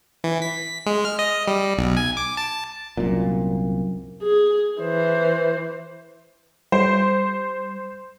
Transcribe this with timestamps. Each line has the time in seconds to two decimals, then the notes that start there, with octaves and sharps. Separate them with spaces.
0.24 E3
0.42 B6
0.86 G#3
1.05 F6
1.19 D#5
1.48 G3
1.77 B1
1.97 G#5
2.17 D6
2.37 A5
2.97 C2 F#2 A#2
4.23 G#4
4.80 E3 C5
6.72 G3 C5